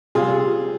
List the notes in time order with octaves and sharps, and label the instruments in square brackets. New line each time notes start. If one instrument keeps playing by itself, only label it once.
[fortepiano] C3 G3 F4 G#4